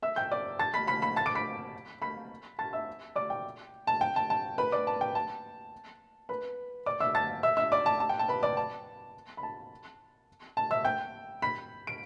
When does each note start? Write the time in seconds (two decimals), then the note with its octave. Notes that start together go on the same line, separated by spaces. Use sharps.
0.02 E5 E6
0.16 G5 G6
0.31 D5 D6
0.59 A5 A6
0.74 B5 B6
0.87 B5 B6
1.02 B5 B6
1.16 A5 A6
1.26 D6 D7
1.35 B5 B6
2.02 B5 B6
2.59 A5 A6
2.73 E5 E6
3.16 D5 D6
3.30 G5
3.87 A5
4.01 G5
4.16 A5
4.30 A5
4.58 B4 B5
4.72 D5 D6
4.87 A5
5.01 G5
5.15 A5
6.29 B4 B5
6.86 D5 D6
7.00 E5 E6
7.15 A5 A6
7.43 E5 E6
7.57 E5 E6
7.72 D5 D6
7.86 A5
8.00 A5
8.09 G5
8.19 A5
8.28 B4 B5
8.43 D5 D6
8.57 A5
9.37 B5
9.43 A5
10.57 A5
10.71 E5 E6
10.85 G5 G6
11.42 B5 B6
11.87 D7